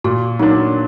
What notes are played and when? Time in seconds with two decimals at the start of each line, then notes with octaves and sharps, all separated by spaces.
0.04 A#2 F#4
0.39 F#3 A#3 D4 D#4